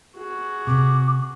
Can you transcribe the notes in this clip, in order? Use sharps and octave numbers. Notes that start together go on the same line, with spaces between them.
F#4 G#4
C3 D6